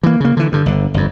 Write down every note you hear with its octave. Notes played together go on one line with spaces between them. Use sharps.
E3 A#3
C#3 A#3
D3 E3
G2 D3
G1 D3
G1 F2